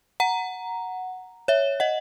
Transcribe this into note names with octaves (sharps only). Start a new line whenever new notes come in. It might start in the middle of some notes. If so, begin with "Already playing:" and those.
F#5 A#5
C#5 E5
D#5 F#5